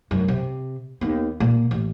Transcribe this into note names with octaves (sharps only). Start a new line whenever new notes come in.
F1 F#2
C3
D#2 B3
A#2 A#3
A1